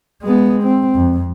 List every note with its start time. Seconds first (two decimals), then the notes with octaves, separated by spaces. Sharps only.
0.23 G#3 B3
0.63 C4
0.95 F2